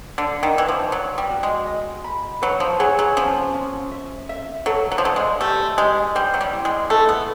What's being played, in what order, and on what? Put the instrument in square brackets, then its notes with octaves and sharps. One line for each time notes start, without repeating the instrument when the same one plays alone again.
[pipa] D3 [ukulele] D5
[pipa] D#3
[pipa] E3 [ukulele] B4
[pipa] F3
[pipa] F#3 [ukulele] D5
[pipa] G3
[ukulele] F#4
[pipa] G#3
[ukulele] D#5
B5
[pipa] F#3 [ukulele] B4
[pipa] F3
[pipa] F#3 [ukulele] G#4
[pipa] F#3
[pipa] F3 [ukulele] C#4
[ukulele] C#4
E5
E5
[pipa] F#3 [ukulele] A4
[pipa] F#3
F3
[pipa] F#3 [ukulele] D5
[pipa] G#3
[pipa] A3 [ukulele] G4
[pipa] G#3 [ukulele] G4
[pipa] G3 [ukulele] C5
[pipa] F#3
G3
[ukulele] E4
[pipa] G#3
[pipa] A3 [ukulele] A4
[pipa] B3